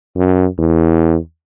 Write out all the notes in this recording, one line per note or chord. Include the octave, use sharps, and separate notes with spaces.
F#2
E2